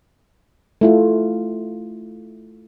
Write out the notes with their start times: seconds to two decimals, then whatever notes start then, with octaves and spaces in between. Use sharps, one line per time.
0.81 A3 E4 F4